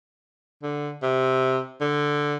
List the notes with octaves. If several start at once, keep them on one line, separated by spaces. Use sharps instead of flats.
D3
C3
D3